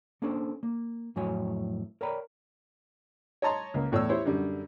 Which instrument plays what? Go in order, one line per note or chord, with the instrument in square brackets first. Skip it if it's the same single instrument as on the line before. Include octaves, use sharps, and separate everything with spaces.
[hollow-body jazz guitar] A#3 C#4 D4 A4 C5
A#3
F2 A2 F#3 F#4 C#5 G#5
A#4 C#5 D5 G5 A#5 B5
[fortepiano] C#5 D#5 A5 A#5 C6
C#2 A#3
E2 A2 C#5 D5 E6
E4 G4 C5 C#5
F#2 D3 G3